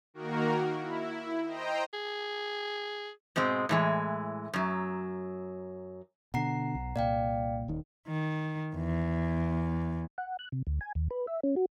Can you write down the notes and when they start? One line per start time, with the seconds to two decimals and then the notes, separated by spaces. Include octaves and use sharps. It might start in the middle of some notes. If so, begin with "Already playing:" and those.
0.14 D#3 A#3 F#4 A#4
0.79 E4
1.46 C5 D#5 G5 A#5
1.93 G#4
3.36 G#2 B2 G#3 C4
3.69 A2 E3 G#3
4.54 F#2 F#3
6.34 B2 D3 F#5 A#5 C7
6.75 B1
6.96 C2 A#2 D5 F5 G5
7.68 D#1 D#3
8.07 D#3
8.75 E2
10.18 F#5
10.39 F#6
10.52 C3
10.67 D2
10.81 G#5
10.95 D#2
11.11 B4
11.27 E5
11.43 C#4
11.56 F#4